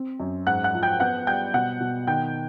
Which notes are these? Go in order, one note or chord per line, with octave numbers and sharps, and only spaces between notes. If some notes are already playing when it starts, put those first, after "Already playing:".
Already playing: C4
F#2
G#2 F#5 F#6
F#5 F#6
F3
G5 G6
B3 F#5 F#6
G3 G5 G6
B2 F#5 F#6
B2
D#3 G5 G6